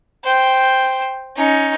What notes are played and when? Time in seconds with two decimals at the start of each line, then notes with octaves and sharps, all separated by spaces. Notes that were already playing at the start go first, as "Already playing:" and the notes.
0.25 C5 G5
1.36 C#4 D#4